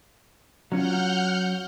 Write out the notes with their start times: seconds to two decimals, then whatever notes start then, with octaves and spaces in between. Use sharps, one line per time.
0.72 F#3 C#4 F4 F#5 F6 G6